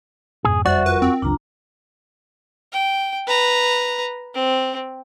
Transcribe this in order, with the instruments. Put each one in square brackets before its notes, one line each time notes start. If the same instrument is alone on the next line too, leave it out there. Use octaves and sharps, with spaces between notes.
[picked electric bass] F2 G#2 B2 [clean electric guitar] G#4
[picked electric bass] F#1 F2 G3 [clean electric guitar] F#4 [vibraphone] C5 E5 [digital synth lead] D5
[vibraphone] F4 A#4 [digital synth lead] B4
[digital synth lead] C4
[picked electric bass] F#1 C#2 F#3 [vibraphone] D4 F4 A#5
[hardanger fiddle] G5
B4 A#5
C4